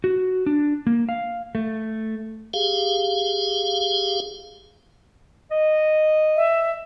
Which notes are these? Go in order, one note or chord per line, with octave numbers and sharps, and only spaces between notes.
F#4
D4
A#3
F5
A3
G4 G#4 F5
D#5
E5